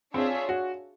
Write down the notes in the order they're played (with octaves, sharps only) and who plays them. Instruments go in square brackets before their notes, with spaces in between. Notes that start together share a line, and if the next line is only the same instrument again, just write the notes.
[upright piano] C4 [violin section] D4 F4 G#4 C#5 E5
[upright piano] F#4